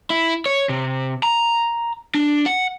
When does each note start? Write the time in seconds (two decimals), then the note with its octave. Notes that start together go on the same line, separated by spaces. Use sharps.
0.10 E4
0.46 C#5
0.69 C3
1.23 A#5
2.15 D4
2.46 F#5